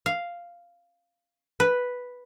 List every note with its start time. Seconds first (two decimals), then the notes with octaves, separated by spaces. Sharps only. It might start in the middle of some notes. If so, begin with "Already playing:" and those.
0.06 F5
1.60 B4